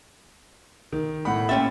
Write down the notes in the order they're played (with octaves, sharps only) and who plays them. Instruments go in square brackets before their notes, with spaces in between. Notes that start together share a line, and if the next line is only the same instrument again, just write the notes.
[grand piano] D#3
A2 F#5 B5
[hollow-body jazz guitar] A#2 C#4 E5 [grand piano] G5 A6